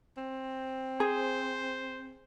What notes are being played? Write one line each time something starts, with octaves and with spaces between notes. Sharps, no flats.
C4
G#4 C5